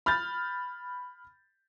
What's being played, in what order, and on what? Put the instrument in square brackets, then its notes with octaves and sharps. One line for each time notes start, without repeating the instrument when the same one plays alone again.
[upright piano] B5 F6 G6 A6